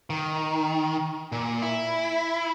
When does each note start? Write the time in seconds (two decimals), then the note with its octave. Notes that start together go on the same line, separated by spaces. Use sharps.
0.10 D#3
1.32 A#2
1.62 E4